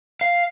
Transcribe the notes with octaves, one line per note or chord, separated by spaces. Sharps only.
F5